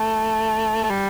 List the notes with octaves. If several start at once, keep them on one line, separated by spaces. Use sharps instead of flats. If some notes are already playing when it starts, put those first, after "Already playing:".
Already playing: A3
A3
G3